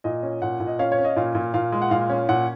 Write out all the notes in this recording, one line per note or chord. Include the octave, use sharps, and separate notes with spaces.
A#2 D#5
C#4
A#2 F#5
A#2
D#5
C#4 F5
C#5
C#4
D#5
A#2 F5
A#2
A#2 F5
G#3
F#5
A#2 F5
C#4
A#2 F#5